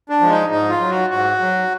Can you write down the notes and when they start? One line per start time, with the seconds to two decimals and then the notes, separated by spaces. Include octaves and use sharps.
0.10 D4
0.20 F3 G#3
0.30 D#4
0.50 G#2 D#4
0.70 F4
0.80 F#3
0.90 F#4
1.10 G#2 F#4
1.40 F#3